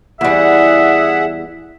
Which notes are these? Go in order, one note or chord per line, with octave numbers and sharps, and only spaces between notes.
E2 G3 G#4 E5 F#5